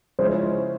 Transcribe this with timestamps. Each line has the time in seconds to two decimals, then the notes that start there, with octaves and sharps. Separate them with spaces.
0.19 C#3 F3 G#3 C#4 E4 C5